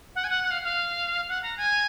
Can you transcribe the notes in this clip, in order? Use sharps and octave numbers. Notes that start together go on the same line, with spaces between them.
F#5
G#5
F#5
F#5
F5
F5
F#5
A#5
G#5